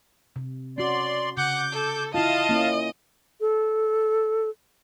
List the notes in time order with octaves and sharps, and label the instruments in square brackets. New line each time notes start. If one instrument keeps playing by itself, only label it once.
[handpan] C3
[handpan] C#4 F#4 [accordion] D5 C6
[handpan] C#3 [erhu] F#5 [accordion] D6 G6
[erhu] A4
[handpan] E4 F4 [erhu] D#5 [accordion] F5 A5
[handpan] A#3 C#4 E4
[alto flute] A4